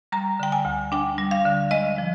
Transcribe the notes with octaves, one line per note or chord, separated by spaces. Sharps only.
G3 A#5
D3 G5
G#5
D2
D4 G5
G3
F5
D3
G#3 D#5
F3